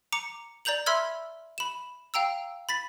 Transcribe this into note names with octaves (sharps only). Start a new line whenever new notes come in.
A#5 D6 C#7
D5 A#5 G6 F7 F#7
E5 B5 C6 E6 F6 G#6
B5 E7
F5 G5 A#5 E6
B5 A6 B6